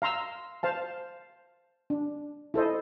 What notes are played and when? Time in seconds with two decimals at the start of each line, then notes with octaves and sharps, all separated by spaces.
0.02 F5 A#5 C6 E6
0.63 C5 F5 A5
1.90 D4
2.54 E4 A4 C5 D#5